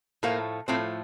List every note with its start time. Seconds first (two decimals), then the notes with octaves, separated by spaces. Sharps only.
0.23 A2 F3 A3 A#3
0.68 A2 F3 A3 C4